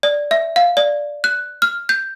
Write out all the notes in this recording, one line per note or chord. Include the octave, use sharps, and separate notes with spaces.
D5
E5
F5
D5
F#6
F6
G6